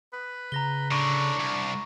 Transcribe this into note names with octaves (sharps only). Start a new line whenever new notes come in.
B4
C#3 A#5 A#6 G7
A2 D3 D4 B5 C#6 A#6
C2